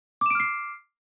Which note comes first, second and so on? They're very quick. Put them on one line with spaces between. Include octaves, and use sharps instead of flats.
D6 E7 D7 F6 C7